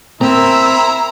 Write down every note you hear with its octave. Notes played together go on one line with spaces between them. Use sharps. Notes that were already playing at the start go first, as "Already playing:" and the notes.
C4 E4 A#4 A#5 C6 E6